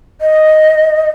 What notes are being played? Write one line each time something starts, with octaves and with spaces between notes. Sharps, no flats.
D#5